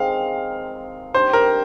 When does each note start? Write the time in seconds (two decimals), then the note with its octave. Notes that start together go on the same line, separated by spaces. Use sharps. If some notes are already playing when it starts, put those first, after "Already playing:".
Already playing: D#3 G#3 C4 F5
1.14 D#3 G3 D4 C5
1.33 A#4